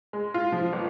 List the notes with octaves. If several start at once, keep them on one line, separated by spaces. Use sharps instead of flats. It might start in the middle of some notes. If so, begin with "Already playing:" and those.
G#3
F4
F3
G1